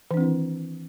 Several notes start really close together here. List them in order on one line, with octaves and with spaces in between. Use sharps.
E3 D4 C4 E4 D#3